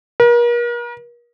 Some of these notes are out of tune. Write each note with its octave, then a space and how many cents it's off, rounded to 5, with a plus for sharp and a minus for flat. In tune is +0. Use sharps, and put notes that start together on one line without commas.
A#4 +40